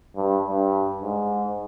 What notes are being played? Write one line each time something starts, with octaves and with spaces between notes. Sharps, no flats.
G2
G2
G#2